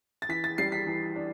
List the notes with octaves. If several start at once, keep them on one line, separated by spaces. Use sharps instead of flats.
A6
E3 B6
A6
G3 C7
B6
E3
D4